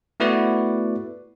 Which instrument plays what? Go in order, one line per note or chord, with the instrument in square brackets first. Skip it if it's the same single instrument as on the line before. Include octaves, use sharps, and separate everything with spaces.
[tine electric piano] A3 B3 E4 F#4 B4 D5